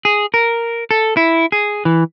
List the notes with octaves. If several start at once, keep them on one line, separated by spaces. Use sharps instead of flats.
G#4
A#4
A4
E4
G#4
E3